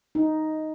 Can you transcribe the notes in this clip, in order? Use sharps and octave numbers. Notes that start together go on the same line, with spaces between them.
D#4